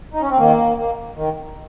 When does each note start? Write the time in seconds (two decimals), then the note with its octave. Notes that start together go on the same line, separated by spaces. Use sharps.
0.13 D#4
0.21 C#4
0.30 C4
0.38 D#3 A#3
0.77 A#3
1.15 D#3